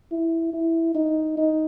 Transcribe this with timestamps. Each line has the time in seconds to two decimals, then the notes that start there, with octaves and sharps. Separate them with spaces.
0.11 E4
0.53 E4
0.95 D#4
1.37 D#4